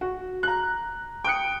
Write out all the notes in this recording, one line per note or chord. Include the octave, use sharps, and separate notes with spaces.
F#4
A#5 F#6
G5 D#6 F#6 C#7